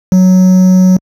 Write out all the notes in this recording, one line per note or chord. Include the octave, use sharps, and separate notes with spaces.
F#3